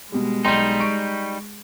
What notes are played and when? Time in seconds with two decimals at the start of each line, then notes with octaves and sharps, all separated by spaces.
0.12 B2 G3 G#3
0.45 B1 G3 D#4 G5 C6
0.80 C#6 D7